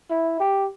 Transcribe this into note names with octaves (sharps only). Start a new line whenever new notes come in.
E4
G4